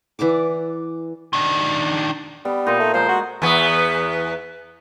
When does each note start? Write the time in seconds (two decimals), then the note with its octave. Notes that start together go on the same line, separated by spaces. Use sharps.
0.19 E3 D5 F#5 D6
1.33 D#3 D4
2.45 G3 B3
2.67 A#2 D#4 C6
2.80 A3
2.94 F3 G#3 A#4 C5
3.09 F#4
3.42 E2 B3